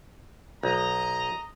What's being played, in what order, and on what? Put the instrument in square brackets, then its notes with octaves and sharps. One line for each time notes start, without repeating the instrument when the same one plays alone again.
[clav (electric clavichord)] B1 [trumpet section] D#5 A#5